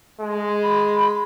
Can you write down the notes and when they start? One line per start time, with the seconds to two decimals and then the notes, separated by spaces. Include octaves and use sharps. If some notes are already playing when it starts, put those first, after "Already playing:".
0.21 G#3
0.63 B5